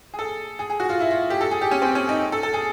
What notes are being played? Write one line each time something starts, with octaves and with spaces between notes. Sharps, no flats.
G#4
A4
G#4
G#4
F#4
F4
E4
F4
G4
A4
G#4
G4
C#4
C4
C#4
D#4
A4
A4
G#4